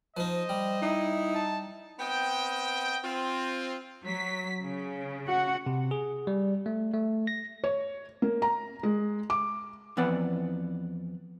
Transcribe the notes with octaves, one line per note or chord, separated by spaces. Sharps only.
F3 D#4 C5 D#5
G3
D#4 E4
A5
B3 C4 D#5 G5
C4 F4
F#3 B6
C#3
F#4 F#5
C3
G#4
G3
A3
A3
A#6
C#5
A#3
A#5
G#3
D6
F2 E3 B3 B4 D5 F#5